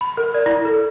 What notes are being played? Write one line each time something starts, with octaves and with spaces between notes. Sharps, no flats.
B5
A#4
D5
E4
A4